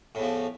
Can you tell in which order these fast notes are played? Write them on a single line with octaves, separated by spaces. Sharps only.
A2 E2 F3